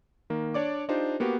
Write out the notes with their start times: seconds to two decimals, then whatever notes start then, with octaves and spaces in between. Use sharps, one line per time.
0.30 D#3 A#3
0.54 D4 C#5 D5 D6
0.89 D4 D#4 F4 G4 C5
1.20 A#3 B3 F#4 G4